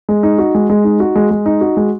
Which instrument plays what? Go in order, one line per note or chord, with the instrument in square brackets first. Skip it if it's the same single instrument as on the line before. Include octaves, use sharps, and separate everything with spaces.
[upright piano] G#3
D#4
F#4
G#3
G#3
D#4
F#4
G#3
G#3
D#4
F#4
G#3